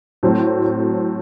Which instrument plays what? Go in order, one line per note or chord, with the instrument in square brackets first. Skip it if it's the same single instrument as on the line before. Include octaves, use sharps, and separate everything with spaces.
[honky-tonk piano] A2 F#3 A3 C4